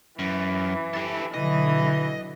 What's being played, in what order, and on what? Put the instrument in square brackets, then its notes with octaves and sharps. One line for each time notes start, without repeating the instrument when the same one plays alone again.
[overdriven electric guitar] F#2 [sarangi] E3
[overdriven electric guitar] G4 A4
[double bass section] B1 D3 F#3 [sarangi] E3 [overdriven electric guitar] D#5